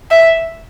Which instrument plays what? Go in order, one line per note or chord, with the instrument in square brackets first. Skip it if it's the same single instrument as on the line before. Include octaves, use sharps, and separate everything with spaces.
[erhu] E5